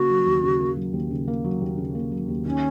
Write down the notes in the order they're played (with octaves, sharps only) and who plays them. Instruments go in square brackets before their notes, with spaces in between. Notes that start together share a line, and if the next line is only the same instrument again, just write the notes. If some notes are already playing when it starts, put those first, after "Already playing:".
Already playing: [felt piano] C#3 A#3 [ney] F#4
[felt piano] F#3
D#2
C#3
A#3
F#3
D#2
C#3
A#3
F#3
D#2
C#3
A#3
F#3
D#2
[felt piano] D#3 [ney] C#4